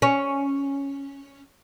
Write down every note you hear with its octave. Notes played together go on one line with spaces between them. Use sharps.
C#4